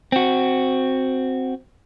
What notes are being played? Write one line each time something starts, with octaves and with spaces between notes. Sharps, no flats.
C4 F#4